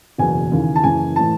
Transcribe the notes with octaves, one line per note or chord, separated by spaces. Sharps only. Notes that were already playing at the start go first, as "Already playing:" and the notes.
F#1 E2 B2 G#5
D#2 C#3 E3
A5
F#1 F#2 E3 G#5
A2 E3 A5